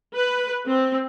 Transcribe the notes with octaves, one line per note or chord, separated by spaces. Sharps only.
B4
C4